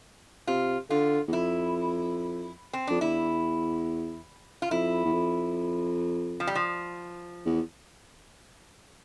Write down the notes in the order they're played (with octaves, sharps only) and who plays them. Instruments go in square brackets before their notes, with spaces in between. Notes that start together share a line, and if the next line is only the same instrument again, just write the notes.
[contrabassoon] C3 [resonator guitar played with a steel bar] F4
[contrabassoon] D3 [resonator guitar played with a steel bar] F4
[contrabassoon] E2
[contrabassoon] F2 [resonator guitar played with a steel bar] E4
[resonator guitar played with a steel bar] C4
[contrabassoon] F2 [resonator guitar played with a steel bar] D4
[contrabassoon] E2 [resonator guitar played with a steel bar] E4
[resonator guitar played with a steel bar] F4
[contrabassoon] F2 [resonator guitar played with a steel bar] E4
[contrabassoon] E2
F2
[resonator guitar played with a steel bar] F3
G3
F3
[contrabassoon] E2